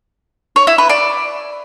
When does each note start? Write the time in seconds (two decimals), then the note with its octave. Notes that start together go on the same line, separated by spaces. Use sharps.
0.56 C#5
0.67 E4
0.78 B4
0.89 D5